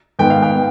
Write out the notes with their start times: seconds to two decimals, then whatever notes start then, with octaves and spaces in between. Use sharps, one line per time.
0.19 G#2 D#3 B3 G5
0.30 F5
0.43 G5
0.55 B3